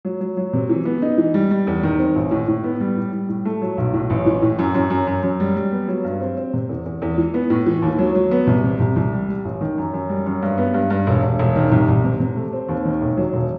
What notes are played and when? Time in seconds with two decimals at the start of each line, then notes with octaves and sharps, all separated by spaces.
0.05 F#3
0.21 F#3
0.37 F#3
0.53 C3
0.69 E3
0.85 B3
1.02 D#4
1.18 E3
1.34 G3
1.51 G3
1.67 E2
1.83 D#3
1.99 C4
2.16 A1
2.31 A2
2.48 A2
2.64 B3
2.80 G3
2.97 A2
3.13 G3
3.29 A2
3.45 A3
3.62 F#3
3.78 B1
3.94 A2
4.10 A1
4.26 E3
4.42 A2
4.59 F#2
4.74 F#2
4.90 F#2
5.07 F#2
5.23 F#2
5.40 G3
5.56 G3
5.72 B3
5.88 F#3
6.04 G2
6.21 C4
6.37 C4
6.54 C3
6.69 E2
6.86 E2
7.02 E2
7.18 E3
7.34 B3
7.50 A2
7.66 E3
7.82 D#2
7.99 F#3
8.15 F#3
8.31 B3
8.47 C2
8.64 C3
8.80 C2
8.96 C2
9.12 G3
9.29 G3
9.45 A1
9.61 D#3
9.78 F#2
9.94 F#2
10.09 G3
10.26 F#2
10.42 G2
10.58 B3
10.74 G2
10.90 G2
11.07 E1
11.23 E1
11.39 E1
11.56 D#3
11.72 C2
11.88 C2
12.04 C3
12.20 C3
12.36 A3
12.53 C4
12.69 D#2
12.85 D#3
13.02 E1
13.17 F#3
13.33 E1